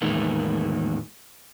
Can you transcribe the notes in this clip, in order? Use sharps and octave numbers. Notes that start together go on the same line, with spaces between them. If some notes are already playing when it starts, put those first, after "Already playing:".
E2 A2 D#3 G#3 A#3